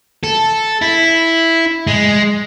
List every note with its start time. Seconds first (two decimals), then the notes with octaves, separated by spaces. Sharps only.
0.23 A4
0.82 E4
1.87 G#3